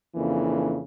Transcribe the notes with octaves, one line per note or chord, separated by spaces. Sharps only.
F2 C#3 E3 A#3 D4